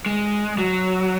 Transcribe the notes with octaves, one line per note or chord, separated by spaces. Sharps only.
G#3
F#3